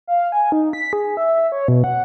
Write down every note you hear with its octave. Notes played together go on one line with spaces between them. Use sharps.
F5
G#5
D#4
B6
G#4
E5
C#5
B2
F#5